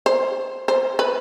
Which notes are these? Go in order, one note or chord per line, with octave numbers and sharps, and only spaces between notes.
C5
C5
B4